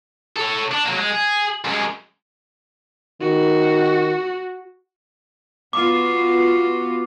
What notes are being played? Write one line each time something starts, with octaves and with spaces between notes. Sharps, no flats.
A4 C#5
D4
F#3 A#3
G#3
G#4
F#2 G#3
D#3 F#4
B3 F4 F#4 D6